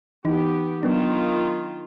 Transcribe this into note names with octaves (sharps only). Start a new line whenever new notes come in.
E3 B3 D#4 G4
D#3 F#3 B3 D4 F4